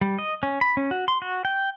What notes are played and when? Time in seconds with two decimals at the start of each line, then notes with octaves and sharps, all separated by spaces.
0.01 G3
0.19 D#5
0.43 C#4
0.61 B5
0.77 C#4
0.91 F#4
1.08 C6
1.22 F#4
1.45 G5